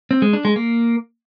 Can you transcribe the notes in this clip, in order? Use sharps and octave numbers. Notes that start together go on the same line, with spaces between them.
C4
G#3
D4
G#3
A#3